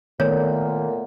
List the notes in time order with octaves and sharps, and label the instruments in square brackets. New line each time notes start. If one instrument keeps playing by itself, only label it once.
[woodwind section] A#2 [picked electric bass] D#3 [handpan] A3 B3 [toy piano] C#5